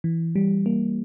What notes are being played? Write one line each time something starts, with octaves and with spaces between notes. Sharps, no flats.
E3
G3
A#3